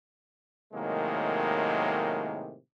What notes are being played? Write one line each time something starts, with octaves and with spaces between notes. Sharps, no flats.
A2 C3 D#3 F#3 G#3 A#3